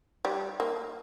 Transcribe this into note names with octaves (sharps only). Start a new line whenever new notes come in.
G3
A#3